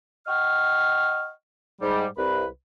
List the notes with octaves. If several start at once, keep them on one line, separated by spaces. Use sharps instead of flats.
D#5 F#5 G5 C#6 F6
G#2 G3
C2 B4